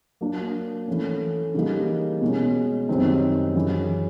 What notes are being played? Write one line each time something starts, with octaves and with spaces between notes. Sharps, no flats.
F#3 A#3 D4
E3 A3 C#4
C#3 E3 G3 A#3 D#4
B2 G#3 C#4
F#2 D#3 G3 C4 D#4
F#2 C#3 E3